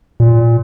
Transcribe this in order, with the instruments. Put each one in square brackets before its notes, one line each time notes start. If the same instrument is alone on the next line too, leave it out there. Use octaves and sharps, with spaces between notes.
[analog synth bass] A#2